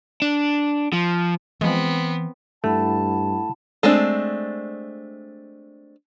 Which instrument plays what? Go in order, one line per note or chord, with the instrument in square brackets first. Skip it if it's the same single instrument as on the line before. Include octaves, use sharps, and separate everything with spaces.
[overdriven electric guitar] D4
F3
[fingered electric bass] E3 [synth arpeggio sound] F3 G#3 [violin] B3 C4
[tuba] G2 [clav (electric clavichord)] A3 [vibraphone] E4 F#5 B5 [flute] A5
[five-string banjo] G#3 A3 C4 D4